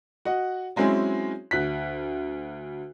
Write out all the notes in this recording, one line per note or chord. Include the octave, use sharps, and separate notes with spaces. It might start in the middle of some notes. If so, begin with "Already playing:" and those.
F#4 D#5 F#5
F#3 G#3 C4 C#4 E4 G#4
D2 F#6 B6